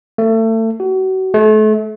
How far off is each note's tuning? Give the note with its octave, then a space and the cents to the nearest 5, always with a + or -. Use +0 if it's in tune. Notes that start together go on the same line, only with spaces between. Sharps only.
A3 +30
F#4 +35
A3 -35